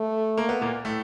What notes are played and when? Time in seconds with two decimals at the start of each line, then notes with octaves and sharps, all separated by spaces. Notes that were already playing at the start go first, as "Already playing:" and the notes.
Already playing: A3
0.38 A#3
0.49 B3
0.61 A#2 A#3
0.85 A2 A3